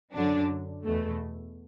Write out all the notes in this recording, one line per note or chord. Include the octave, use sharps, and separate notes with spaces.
F#2 D3 F#3 D4
E2 B2 A3